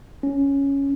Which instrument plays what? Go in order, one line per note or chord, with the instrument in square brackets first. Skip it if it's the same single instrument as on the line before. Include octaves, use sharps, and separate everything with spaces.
[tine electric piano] C#4